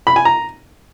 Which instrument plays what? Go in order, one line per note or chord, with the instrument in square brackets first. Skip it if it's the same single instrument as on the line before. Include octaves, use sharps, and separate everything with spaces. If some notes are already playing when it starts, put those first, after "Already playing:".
[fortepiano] B5
G#5
A#5